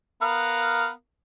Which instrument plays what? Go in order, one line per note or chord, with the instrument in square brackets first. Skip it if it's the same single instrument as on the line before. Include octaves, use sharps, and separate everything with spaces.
[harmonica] B3 A#4 F5